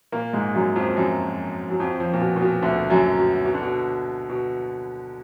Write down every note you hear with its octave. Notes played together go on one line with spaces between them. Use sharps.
A#2 A#3
G#2 G#3
F#2 F#3
F2 F3
F#2 F#3
F#3
F2 F3
F2 F3
A#2
B2
A#2
B2
D2 D3
F#2 F#3
B2
B2
D3
B2
B2